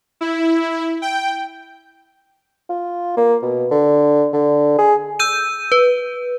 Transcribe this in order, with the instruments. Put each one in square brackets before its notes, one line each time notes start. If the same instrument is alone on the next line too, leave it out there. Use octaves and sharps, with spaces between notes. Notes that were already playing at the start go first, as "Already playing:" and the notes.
[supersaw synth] E4
G5
[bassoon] F4
A#3
B2
D3
D3
G#4
[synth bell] E6 G6 D#7
B4